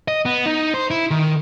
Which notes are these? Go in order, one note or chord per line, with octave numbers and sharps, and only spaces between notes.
D#5
B3
D#4
C5
E4
D#3